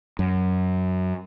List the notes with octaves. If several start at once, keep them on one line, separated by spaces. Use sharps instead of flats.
F#2